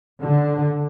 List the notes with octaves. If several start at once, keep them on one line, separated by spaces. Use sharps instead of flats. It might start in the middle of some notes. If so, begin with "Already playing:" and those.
D3